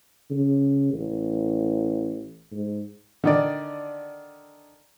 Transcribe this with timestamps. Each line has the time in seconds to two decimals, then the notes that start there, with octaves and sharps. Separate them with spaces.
0.31 C#3
0.93 A1
2.51 G#2
3.24 D3 D#3 D5